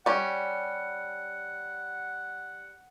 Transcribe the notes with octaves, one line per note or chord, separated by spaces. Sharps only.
G3 C#4 F#5